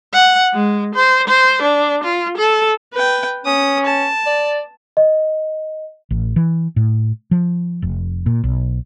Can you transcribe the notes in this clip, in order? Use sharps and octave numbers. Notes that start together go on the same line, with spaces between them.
F#5
G#3
C5
C5
D4
F4
A4
B4 G5
C#4 D#6
A5
D5
D#5
A1
E3
A2
F3
F1
A#2
B1